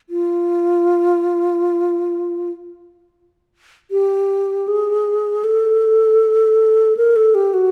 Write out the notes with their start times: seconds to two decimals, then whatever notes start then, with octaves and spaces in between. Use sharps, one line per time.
0.10 F4
3.91 G4
4.68 G#4
5.44 A4
6.97 A#4
7.16 A4
7.35 G4
7.54 F#4